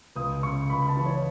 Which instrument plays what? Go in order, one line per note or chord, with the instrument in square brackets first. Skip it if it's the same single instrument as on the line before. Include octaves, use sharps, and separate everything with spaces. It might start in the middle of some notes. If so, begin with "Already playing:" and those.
[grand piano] C#2 D#6
C#3 C#6
C#2 B5
B5
A5
E3
C#5